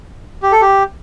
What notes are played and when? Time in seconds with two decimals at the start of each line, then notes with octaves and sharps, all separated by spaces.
0.43 G4
0.52 A4
0.61 G4